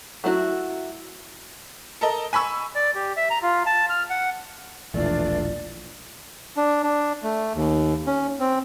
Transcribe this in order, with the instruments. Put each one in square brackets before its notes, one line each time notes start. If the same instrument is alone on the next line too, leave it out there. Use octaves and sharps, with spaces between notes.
[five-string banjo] F#3 A3 D4 E4 F#4
[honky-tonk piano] A4 A#4 D#5
G#5 B5 C#6 E6
[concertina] D5
G4
E5
A#5
F4
A5
F6
F#5
[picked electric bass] E1 A#1 [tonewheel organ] E3 A3 [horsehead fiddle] D4 F4 [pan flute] D5
[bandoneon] D4
D4
A3
D#2
C#4
C4